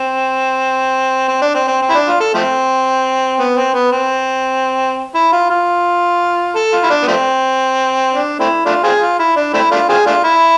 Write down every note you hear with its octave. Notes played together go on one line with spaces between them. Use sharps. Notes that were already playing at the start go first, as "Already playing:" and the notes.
Already playing: C4
C4
D4
C4
C4
C4
E4
D4
F4
A4
F3 A3 C4
B3
C4
B3
C4
E4
F4
F4
A4
F4
E4
D4
B3
F3 A3 C4
D4
A3 C4 E4
A3 D4 F4
C4 F4 G#4
F4
E4
D4
A3 C4 E4
A3 D4 F4
C4 F4 G#4
A3 D4 F4
E4